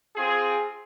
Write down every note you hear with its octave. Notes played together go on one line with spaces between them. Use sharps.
C4 F4 G#4